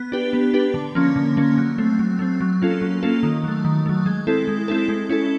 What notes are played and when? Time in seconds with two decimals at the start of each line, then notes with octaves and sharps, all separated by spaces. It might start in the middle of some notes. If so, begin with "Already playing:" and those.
Already playing: B3
0.12 D4 G4 B4
0.33 B3
0.54 D4 G4 B4
0.74 D3
0.95 F3 A#3 C#4
1.16 D3
1.37 F3 A#3 C#4
1.57 F#3
1.78 A3 C4
1.99 F#3
2.19 A3 C4
2.41 F#3
2.62 A#3 C#4 F4 A4
2.82 F#3
3.03 A#3 C#4 F4 A4
3.23 D#3
3.44 F#3 A3
3.65 D#3
3.86 F#3 A3
4.06 G#3
4.27 C4 E4 A4
4.48 G#3
4.68 C4 E4 A4
4.88 G#3
5.09 C#4 E4 A4